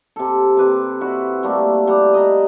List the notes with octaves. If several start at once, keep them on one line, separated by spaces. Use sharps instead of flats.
C3 A4
C3 B4 D6
E4 F#4
G3 A3 A#3
G3 F#5
D#5 A#5